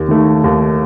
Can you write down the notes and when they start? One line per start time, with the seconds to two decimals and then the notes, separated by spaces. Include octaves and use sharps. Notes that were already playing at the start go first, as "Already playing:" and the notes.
Already playing: D#2
0.09 D#3 A3
0.44 D#2